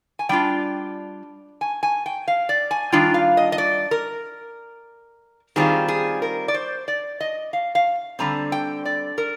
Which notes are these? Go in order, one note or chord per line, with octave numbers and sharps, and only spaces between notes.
G#5
G3 D4 F4 G5
G#5
G#5
G5
F5
D5
G#5
D#3 G3 D4 F4 G5
F5
D#5
D#5
D5
A#4
D#3 G3 C4 F4 G#4
G#4
A#4
D5
C5
D5
D#5
F5
F5
D3 G3 C4 A#5
G5
D5
A#4